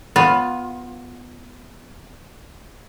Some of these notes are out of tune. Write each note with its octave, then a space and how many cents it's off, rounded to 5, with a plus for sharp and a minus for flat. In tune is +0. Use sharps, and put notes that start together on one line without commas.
B3 +0 F4 +15